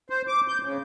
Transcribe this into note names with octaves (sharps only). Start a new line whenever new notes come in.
C5
D6
G6
C#3